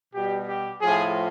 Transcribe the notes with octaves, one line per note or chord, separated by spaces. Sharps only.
B2 G3 G4
G4
A2 F3 G#4